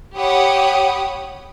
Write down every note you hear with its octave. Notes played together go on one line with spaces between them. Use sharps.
G4 C#5 F#5 B5 D#6